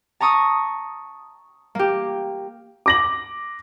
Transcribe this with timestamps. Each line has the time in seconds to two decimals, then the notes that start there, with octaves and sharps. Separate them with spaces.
0.20 A5 A#5 C#6 D#6 E6
1.75 A#3 G4
2.86 D6 A#6 F#7